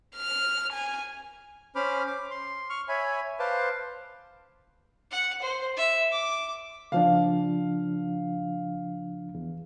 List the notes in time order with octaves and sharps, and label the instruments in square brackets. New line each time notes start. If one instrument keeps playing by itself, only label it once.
[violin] F6
G#5
[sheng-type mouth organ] C#4 C5 B5 D6 F6
D6
C6
C#6 F6
C#5 E5 G#5 B5
B4 C5 F5 A5 C6 D6
[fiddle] F#5
C5
E5
D6
[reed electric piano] C#3 F3 D4 [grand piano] F5
[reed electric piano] E2